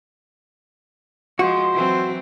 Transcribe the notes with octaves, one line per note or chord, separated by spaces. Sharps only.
F3 G#3 F#4 C5
E3 F#3 C4